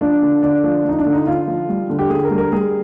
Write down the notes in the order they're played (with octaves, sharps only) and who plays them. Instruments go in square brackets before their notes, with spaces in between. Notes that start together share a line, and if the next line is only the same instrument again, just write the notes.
[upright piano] F3 D4
D3
D3 D4
F3
F3 D#4
D4
D3
D#4
D3 F4
F3
G3
D3
G4
D3 G#4
A#4
G3
A#4
G3 G#4